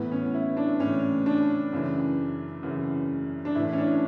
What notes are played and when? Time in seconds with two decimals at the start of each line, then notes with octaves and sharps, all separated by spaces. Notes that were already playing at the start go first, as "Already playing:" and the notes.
Already playing: A2 E3 B3
0.12 C#4
0.34 E4
0.57 D4
0.80 A2 E3 C#4
1.26 D4
1.72 F#2 C#3 E3
2.63 F#2 C#3 E3
3.45 D4
3.55 A2 E3 E4
3.73 C#4
3.78 D4